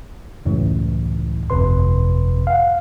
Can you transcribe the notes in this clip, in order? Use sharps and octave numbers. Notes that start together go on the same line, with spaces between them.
C#2 F#2 A2 E3
G1 F2 C3 B4 C6
F5 F#5